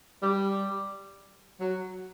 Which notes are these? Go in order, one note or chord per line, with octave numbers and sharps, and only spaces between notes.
G3
F#3